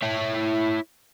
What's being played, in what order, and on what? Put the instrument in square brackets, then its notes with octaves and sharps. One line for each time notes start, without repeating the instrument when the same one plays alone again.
[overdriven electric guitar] E4 C#5